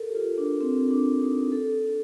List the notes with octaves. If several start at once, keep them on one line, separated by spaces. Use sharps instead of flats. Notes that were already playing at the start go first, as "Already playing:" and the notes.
Already playing: A4 A#4
G4
F4
D4
C4
D4
D#4
A4